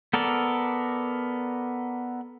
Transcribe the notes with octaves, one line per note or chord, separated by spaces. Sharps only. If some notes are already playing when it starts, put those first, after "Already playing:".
B3 A4 A#4 D5